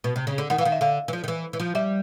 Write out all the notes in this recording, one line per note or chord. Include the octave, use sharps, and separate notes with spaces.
B2
C3
C#3
D3
D#3 F#5
E3
D#3 F5
E5
D3 F5
E3
F3
D#3
E3
E3
F3
G3 E5